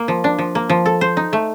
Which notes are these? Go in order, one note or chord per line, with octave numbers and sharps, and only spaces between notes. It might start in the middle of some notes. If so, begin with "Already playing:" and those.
Already playing: A#3
F3
D4
F3
A#3
F3
A4
C5
D#4
A3